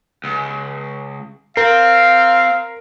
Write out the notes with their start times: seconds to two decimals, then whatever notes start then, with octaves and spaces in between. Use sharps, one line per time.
0.24 C#2
1.57 C4 A#4 F5